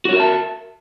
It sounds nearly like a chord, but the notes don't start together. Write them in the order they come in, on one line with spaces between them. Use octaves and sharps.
F#4 C#5 A#4 E5 A5